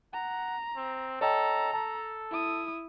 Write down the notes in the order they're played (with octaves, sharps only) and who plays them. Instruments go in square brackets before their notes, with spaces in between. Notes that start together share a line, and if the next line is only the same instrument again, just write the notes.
[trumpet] F#5 [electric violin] A#5
[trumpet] C4
[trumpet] A4 [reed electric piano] C#5 D#5 G5 [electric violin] A#5
[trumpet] A4 [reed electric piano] A5
[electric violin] E4 D#6